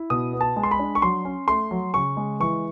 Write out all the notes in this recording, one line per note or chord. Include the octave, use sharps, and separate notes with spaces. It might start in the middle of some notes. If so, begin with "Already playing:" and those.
Already playing: E4
B2 D#6
B3
A5
G#3
C6
B5
D4
C#6
F#3 C6
C#4
A3 C6
F#3
C#3 C#6
G#3
E3 C#6